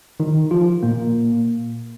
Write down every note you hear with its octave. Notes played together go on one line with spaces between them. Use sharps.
D#3 D#4
F3 F4
A#2 A#3